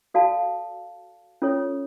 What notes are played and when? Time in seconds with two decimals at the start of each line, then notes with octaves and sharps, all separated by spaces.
0.14 F#4 A4 D5 F5 A5
1.42 C#4 F4 A4 C#5